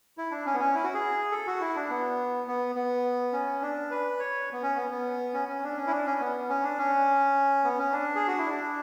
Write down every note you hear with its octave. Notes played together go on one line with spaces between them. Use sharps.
E4
D4
C#4
B3
C#4
E4
F#4
G#4
A4
F#4
E4
D4
B3
B3
B3
C#4
D4
B4
C#5
B3
C#4
B3
B3
C#4
C#4
D4
C#4
E4
D4
C#4
B3
C#4
D4
C#4
B3
C#4
D4
G#4
F#4
E4
D4